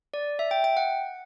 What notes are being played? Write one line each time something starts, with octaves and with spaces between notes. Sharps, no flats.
D5
E5
G5
G5
F#5